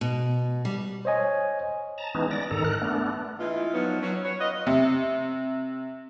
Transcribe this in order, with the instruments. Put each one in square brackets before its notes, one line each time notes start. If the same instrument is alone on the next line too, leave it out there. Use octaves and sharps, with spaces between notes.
[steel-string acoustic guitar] B2
G3
[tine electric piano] C5 C#5 D#5 G#5
[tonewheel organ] A5 A#5
E3 G#3 B3 C#4 D#4
D5 A#6
G#2 D#3 A4 A#5
A#4 F#6
A3 B3 D4
[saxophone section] E3 G#3 E4 F4
F3 F#3 B3 D#4
F#3 C#4
F#3 B4 C#5
F4 B4 D#5
[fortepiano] C3